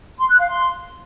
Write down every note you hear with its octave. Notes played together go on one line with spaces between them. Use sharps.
C6
F#6
F5
C6